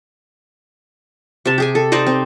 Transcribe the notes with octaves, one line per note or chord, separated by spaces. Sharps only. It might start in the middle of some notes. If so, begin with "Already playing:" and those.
C3 A5
G4 G#4 G#5
A4
D#4 C5 D5 D#5
C4